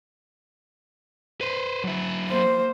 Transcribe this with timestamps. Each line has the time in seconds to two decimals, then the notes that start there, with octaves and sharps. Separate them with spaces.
1.41 B4 C5
1.84 F#3 E4
2.28 A#3 C5